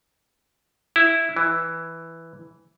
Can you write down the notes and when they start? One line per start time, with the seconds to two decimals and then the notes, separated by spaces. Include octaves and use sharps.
0.96 E4
1.36 E3